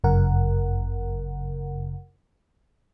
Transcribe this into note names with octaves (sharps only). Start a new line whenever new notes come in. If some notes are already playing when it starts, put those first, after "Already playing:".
G1 F#2 C#3 A#4 F#5